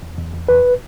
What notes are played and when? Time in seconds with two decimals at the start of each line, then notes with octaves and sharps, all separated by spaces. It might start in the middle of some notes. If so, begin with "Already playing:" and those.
0.03 E2
0.19 E2
0.34 E2
0.48 E2 B4